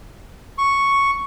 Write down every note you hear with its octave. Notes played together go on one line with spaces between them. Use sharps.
C#6